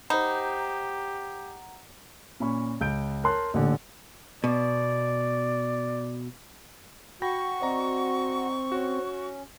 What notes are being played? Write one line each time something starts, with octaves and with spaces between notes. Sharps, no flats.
D#4 G4 C5 F#5 A#5 B5
A#2 C#4 B5 C#6
C#2 G6 D7
A#4 C#5 A5 C6 F#6
A1 A#2 D3
B2 D5
F#4 G5 B5 C#6 A#6
C4 D5 D#5 A#5
C#4 F#4